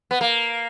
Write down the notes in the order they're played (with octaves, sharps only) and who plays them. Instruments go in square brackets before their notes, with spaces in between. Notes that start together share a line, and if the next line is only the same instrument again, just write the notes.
[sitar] B3
A#3